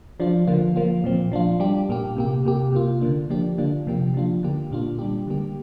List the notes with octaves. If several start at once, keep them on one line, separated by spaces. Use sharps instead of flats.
F3 D4 F4
D3 F3 A#3 F4
F3 A#3 F4
A#2 F3 C4
F3 D4 F4
G3 D4 G4
A#2 A#3 G4
C3 A#3 G4
C3 A#3 G4
C3 A#3 F4
D3 A#3 D4
F3 A#3 D4 G4
D3 A#3 D4 F4
C3 F3 A#3 G4
F3 D4 F4
D3 A#3 G4
A#2 A#3 D4 F4
G3 D4 G4
D3 G3 A#3 G4